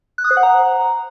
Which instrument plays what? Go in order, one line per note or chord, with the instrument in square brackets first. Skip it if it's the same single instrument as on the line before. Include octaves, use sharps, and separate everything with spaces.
[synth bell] F#6
D#6
C5
F#5
A#5